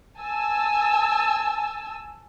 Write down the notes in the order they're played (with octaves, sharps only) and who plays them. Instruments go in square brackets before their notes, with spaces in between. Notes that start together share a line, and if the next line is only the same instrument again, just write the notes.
[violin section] G#5 A5 E6